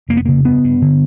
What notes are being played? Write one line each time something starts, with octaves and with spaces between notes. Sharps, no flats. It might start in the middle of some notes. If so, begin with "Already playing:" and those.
F1 A#3
B3
C#3 A#3
G2 B3
G2
D3